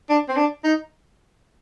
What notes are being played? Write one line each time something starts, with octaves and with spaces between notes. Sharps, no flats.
D4
C4
D4
D#4